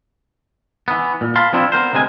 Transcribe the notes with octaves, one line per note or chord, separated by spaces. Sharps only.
E3 B3
A#2
F5 A5 B5 C6
F3 B3 C4 D4 E4 F4
B3 A#4 C5
D2 C3 G#3 A#4 G#5